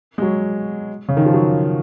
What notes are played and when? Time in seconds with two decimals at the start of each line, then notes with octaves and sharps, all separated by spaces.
0.18 G#3
0.22 F#3
1.09 C#3
1.17 D#3
1.26 F3
1.33 F#3